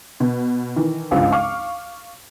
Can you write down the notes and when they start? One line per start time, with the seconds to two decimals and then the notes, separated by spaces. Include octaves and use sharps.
0.20 B2
0.76 D#3 E3
1.11 G#1 C#2 G2 F3
1.32 F5 C#6 D6 F6